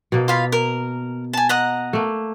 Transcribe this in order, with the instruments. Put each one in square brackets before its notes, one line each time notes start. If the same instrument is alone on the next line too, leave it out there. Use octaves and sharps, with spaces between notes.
[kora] B2 A#3
[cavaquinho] F4 F5 B5
A#4
G#5 A5
D#5 F#5 A#5
[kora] A3 A#3